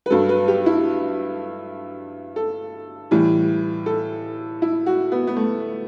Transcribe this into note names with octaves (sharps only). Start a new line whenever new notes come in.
B4
G2 F#3 A4
B4
G4
E4
A4
A2 E3 G3
A4
E4
F#4
B3
B3
A3